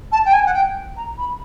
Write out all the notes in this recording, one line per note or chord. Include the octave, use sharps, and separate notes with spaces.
A5
G5
G#5
F#5
G5
A#5
B5